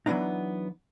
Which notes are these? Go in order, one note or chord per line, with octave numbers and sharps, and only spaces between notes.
E3 F#3 G#3 B3 D4 D#4